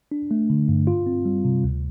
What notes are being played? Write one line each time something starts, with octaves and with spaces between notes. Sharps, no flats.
D4
A3
D3
G2
F4
C4
G3
C3
D2